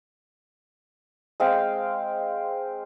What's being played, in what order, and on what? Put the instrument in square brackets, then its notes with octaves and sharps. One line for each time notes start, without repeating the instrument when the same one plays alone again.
[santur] G#3 C4 F5 G5